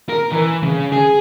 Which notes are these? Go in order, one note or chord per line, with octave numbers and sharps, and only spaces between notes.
A#4
E3
C#3
G#4